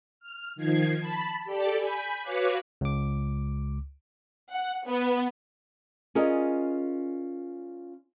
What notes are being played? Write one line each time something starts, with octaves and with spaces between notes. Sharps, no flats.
F6
D#3 F3 G#6 C7
A5 B5
G4 A4 D5
G#5 B5 G6 B6
F#4 B4 C#5 F5 D6 F#6
C#2 D6
F#5
B3
C#4 F4 G#4 A#4 D5 D#5